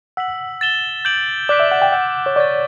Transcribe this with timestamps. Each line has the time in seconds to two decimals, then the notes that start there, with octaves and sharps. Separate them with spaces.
0.17 F#5 E6 B6 F#7
0.61 A6 E7 G7
1.05 D6 G6 D7 F#7
1.49 D5 D6 F#6 B6 D7
1.60 E5
1.71 F#5
1.82 G5
1.92 F#5 E6 G6 D7 F#7
2.26 C#5
2.36 D5 C#6 F#6 A6